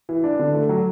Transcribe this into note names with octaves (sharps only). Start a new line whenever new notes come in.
E3
D4
D3
A3
F#3